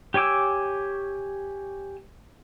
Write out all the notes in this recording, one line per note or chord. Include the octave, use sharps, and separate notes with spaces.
G4 C#5 G#5 D6 E6